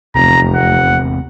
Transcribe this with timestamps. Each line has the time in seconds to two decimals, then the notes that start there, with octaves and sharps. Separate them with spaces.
0.15 F1 E2 C3 A#5
0.55 F#5